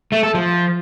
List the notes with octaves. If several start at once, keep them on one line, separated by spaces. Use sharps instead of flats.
A3
A4
F3